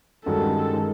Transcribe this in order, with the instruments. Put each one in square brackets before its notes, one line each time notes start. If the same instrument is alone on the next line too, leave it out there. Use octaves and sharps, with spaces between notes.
[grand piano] G2 D#3 G#3 C#4 F#4 [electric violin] A4
[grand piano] D#3 G#3